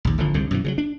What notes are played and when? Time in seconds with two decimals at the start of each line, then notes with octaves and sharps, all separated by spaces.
0.05 A#1 D#2
0.18 G#1 D3 F3
0.34 C2 G#2 D3
0.51 F#2 B2 E3
0.64 C#3 F3 F#3
0.78 D4